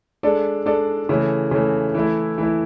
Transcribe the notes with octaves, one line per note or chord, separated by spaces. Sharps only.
G#3 D4 A4 D5
G#3 D4 A4 D5
C#3 E3 A3
C#3 E3 A3
E3 A3 E4
E3 A3 E4